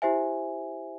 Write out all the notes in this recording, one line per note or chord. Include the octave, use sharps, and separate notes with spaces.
E4 G4 C5 E5 G#5